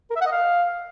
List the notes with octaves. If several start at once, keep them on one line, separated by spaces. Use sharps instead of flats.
A#4
E5
F#5
D#5
F5